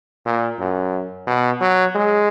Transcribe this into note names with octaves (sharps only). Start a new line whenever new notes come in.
A#2
F#2
B2
F#3
G#3